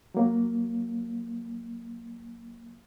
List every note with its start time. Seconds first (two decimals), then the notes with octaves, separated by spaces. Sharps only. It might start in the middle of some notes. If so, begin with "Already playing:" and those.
0.14 F#3 A#3